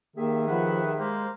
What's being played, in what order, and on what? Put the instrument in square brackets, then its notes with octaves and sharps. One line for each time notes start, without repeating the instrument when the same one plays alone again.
[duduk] D#3 [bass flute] A#3 [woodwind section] G4 G#4 E5
[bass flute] F3 [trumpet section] B4 F#5
[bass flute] G#3 [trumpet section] A#3 C5